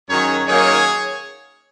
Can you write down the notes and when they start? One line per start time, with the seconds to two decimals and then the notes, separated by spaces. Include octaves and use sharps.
0.09 F#2 D#3 F#3 C#4 G#4 C#5
0.47 F#2 D#3 F#3 A#3 D#4 G#4 C#5